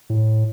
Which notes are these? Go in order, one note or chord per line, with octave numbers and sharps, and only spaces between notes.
A2